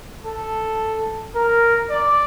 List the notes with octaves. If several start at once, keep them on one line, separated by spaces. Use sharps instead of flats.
A4
A#4
D5